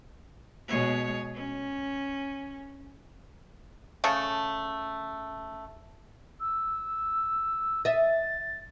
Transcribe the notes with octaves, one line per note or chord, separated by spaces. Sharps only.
B2 G#3 C#5
C#4
C#3 A3 A4
E6
D#5 E5 A6